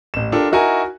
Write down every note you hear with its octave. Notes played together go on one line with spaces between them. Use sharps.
A1 E7
D4 F4 G4 A4 A#4
D#4 E4 F#4 A#4 G#5 A#5